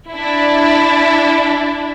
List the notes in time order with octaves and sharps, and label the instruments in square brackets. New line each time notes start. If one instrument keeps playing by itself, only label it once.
[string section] D4 E4